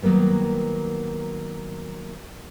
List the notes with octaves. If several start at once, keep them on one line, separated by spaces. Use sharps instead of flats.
D#3 F#3 G3 A#3 B3